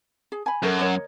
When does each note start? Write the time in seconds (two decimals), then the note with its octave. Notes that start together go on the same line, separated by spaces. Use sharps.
0.32 G#4
0.46 G#5 B5
0.63 F#2 A4 A#4
0.79 A#4 C#5 D#5